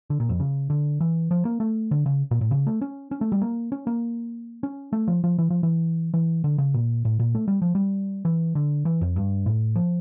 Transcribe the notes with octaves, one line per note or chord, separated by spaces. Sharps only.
D3
A#2
F2
C#3
D3
E3
F3
A#3
A3
D3
C#3
A#2
A2
C#3
A3
C#4
C#4
A3
G3
A#3
C#4
A#3
C#4
A3
F3
F3
E3
F3
E3
E3
D3
C#3
A#2
A2
A#2
A3
G3
F3
G3
E3
D3
E3
F2
G2
A2
F3